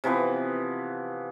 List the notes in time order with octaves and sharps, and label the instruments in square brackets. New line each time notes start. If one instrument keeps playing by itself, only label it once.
[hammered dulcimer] C3 E3 F3 B3